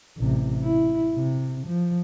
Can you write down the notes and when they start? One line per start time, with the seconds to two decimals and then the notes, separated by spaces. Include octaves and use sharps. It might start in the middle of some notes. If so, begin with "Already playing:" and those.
0.17 A1 C3
0.63 E4
1.15 C3
1.67 F3